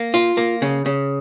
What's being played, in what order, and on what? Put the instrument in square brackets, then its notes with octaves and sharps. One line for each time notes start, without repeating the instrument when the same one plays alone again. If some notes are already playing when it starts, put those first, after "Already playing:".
Already playing: [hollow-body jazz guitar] A#3
F4
A#3
C#3
C#3